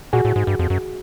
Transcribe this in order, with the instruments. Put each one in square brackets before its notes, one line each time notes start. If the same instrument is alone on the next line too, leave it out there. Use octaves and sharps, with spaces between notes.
[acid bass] A#2 [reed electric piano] F#4 G#4
[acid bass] A2
G#2
G2
F2
F#2